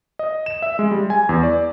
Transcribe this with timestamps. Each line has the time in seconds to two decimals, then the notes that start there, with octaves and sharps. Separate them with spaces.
0.19 D#5
0.46 E7
0.62 E5
0.79 G#3
0.91 G3
1.10 G#5
1.29 E2
1.43 D5